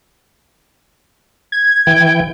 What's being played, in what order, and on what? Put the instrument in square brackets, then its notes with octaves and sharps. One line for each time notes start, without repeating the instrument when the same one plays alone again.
[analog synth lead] G#6
[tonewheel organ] E3 G5